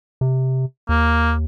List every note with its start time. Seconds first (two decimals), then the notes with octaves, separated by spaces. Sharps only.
0.21 C3
0.89 D#2 A#3